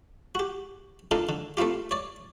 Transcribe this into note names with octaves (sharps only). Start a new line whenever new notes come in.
F#4 G4
D4 D#4 F4 A4 A#4
D3
A3 C4 E4 F4 G4
C#5 D5